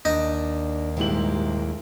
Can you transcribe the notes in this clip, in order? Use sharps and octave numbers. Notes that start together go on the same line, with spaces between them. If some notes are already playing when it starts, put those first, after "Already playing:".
D#2 D4 D#4
D#1 G#2 G#3 E4 G4 F#7